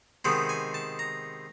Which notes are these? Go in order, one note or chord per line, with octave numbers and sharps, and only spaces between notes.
C3 D#3 G#3 B3
G#5
A5
A#5